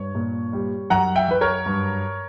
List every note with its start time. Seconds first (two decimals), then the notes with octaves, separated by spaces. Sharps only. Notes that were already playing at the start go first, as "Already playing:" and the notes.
Already playing: G2 C#5
0.15 A#2
0.53 G3
0.90 F#2 F#5 A#5
1.16 E5 G5
1.28 F#2 B4
1.41 A#4 C#5
1.66 G2